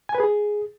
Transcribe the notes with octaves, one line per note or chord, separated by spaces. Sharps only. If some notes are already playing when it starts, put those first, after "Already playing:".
G#5
B4
G#4